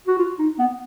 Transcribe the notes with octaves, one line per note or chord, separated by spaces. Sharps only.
F#4
F4
D#4
B3